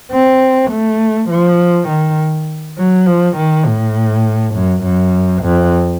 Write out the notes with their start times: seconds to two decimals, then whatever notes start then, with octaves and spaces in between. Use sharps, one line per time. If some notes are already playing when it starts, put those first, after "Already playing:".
0.12 C4
0.71 A3
1.30 F3
1.89 D#3
2.78 F#3
3.06 F3
3.36 D#3
3.66 A2
4.55 F#2
4.84 F#2
5.43 F2